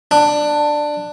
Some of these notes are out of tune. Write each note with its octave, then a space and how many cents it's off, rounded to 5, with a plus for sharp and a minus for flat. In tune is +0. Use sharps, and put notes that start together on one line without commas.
D4 +15